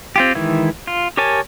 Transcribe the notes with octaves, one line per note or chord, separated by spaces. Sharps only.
C4 F4 G4
D#3 E3 G#3 E4
F4
G4 A#4 C#5 G#5 A5